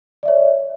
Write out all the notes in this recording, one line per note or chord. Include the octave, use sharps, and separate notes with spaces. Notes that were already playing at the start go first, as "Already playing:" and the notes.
C#5 D5 E5